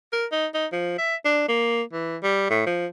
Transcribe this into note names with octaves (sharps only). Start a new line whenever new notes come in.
A#4
D#4
D#4
F3
E5
D4
A#3
E3
G3
A2
F3